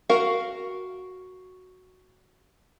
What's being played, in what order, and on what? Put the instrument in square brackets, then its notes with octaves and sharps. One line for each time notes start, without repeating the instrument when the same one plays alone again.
[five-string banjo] F#4 A#4 F5